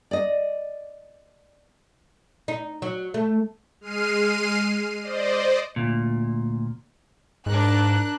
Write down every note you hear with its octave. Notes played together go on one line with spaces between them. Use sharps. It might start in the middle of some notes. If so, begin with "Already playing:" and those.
D5 D#5
D#4
F#3
A3
G#3 F6 C7 D#7
C5 D5 D#5
D2 A#2
G#2 D4 A#4 F#6